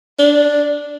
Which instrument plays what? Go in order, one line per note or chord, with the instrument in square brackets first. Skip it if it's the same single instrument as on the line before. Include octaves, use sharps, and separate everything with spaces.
[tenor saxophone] D4